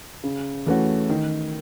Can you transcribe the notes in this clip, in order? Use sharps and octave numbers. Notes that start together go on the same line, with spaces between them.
C#3
E3 A3 C#4 F#4
D#3